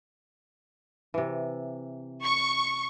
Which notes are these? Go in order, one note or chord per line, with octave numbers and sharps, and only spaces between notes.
C3 E3
C#6